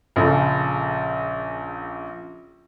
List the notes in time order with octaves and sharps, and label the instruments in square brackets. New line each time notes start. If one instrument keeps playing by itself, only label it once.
[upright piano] A#1 C#3 A4